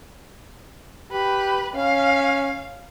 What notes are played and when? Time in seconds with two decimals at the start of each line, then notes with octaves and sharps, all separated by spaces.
1.12 G4 B4
1.76 C#4 F5